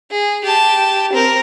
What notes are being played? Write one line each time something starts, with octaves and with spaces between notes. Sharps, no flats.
G#4
G4 A5
C4 A#4